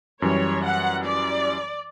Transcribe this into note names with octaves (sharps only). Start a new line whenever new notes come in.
F#2 E3 G3 C#5
F#5
D5